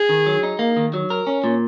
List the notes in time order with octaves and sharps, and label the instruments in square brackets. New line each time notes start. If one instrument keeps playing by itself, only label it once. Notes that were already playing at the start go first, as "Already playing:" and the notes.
Already playing: [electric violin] G#4
[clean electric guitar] D#3
F#3
D#4
A#3
D#3
F#3
A#4
C#4
A#2